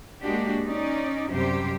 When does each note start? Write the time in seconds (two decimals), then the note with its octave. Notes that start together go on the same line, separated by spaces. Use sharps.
0.20 G#3 A#3 D4 F#4 G4
0.64 C#4 D#4 D5
1.30 F#2 C3 G3 G4 C5